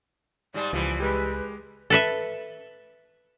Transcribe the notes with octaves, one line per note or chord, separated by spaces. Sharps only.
G#2 G3 D5
C#2 E3 F3 G3
G#3 G4 B4
A4 B4 E5